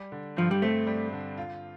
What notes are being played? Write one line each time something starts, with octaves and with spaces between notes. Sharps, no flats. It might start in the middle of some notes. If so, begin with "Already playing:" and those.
Already playing: G3
D3
G2 F3
G3
A3 C4
G3
D3
F4